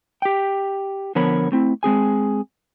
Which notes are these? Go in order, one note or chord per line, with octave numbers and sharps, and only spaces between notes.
G4 G5
D3 F3 B3 A#4 C#5 B5
A3 C4 E4
G#3 C4 G#4 G#5